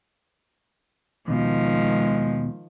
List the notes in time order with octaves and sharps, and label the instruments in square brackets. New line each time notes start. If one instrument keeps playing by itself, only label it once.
[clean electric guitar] D#2 B2 [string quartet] D#3 F3 [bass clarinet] G#3